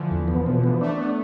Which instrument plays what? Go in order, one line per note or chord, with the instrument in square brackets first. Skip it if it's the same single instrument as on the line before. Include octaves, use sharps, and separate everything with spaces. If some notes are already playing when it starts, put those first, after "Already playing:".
Already playing: [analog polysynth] D3 E3 F3
[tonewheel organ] E2
B3
B2
B3
[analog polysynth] A3 [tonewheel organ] D4
[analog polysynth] B3 [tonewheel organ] D4